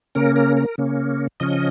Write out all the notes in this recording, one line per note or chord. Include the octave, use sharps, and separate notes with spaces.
C#3 A#3 C#4 A#4
A#4
A#4
C#3 A#3 C#4
C#3 F3 C#4 D#5